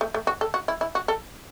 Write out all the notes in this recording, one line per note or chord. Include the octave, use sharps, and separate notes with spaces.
A3
A3
F#4
A4
F#4
E4
E4
F#4
A4